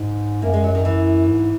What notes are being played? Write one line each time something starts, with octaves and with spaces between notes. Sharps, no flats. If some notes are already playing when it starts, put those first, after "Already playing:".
Already playing: G#2 G#3
F#2 A#3
G#3
F#3
D#3
E3
G#2